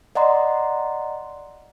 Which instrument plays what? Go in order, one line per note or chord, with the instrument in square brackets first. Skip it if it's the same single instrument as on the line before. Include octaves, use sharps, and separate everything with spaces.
[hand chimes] D5 D#5 F#5 A#5 C6